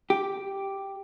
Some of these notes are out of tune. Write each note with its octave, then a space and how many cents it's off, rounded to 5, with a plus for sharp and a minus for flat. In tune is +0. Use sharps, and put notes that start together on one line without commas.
G4 +0